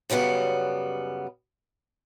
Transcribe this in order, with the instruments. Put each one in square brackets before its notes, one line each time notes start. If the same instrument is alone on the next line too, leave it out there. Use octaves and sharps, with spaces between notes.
[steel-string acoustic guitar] F#2 C#3 G3 B3 F#5